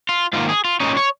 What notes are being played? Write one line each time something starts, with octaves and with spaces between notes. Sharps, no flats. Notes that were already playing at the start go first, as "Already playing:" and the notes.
F4
G#2 D#3 A#3 F4
G#4
F4
A#2 G#3 C#4 D#4
C#5